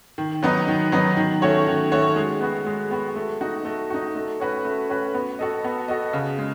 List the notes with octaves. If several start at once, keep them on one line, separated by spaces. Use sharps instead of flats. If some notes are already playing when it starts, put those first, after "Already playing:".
D#3
F#3 B3 D#4
D#3
F#3 B3 D#4
D#3
A3 C#4 F#4 C#5
D#3
A3 C#4 F#4 C#5
G#3
B3 F#4
G#3
B3 F#4
A3
D#4 F#4
A3
D#4 F#4
A3
C#4 F#4 B4
A3
C#4 F#4 B4
B3
F#4 A4 D#5
B3
F#4 A4 D#5
C#3
G#3